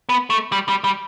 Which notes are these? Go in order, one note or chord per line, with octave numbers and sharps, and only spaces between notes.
B3
A3
G3
G3
G3